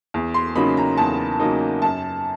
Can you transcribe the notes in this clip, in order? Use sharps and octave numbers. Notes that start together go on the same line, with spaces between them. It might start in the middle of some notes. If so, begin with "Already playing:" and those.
E2
C6
C#3 F#3 A#3 D#4 B5
A#5
E2 A5
C#3 F#3 A#3 D#4
F#2 A5